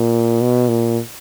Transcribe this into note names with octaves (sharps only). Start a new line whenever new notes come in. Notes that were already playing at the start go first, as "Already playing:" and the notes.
Already playing: A#2
B2
A#2